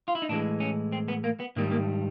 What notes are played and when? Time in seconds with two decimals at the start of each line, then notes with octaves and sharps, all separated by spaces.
0.08 F4
0.15 E4
0.22 D#4
0.29 A2 E3 G#3 D4
0.60 C#4
0.92 C4
1.08 B3
1.24 A#3
1.40 B3
1.56 G#2 D#3 G3 A#3
1.72 A#3